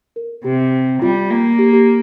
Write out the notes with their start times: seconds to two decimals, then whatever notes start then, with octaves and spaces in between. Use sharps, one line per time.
0.16 A#4
0.44 C3 G4
1.02 G3 F4
1.30 A#3
1.59 G4
1.73 G4